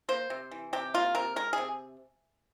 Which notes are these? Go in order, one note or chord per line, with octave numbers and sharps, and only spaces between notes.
A#3 C5
C3
E3
C3 G4
A#3 F4
C3 A#4
G#3 A#4
C3 G#4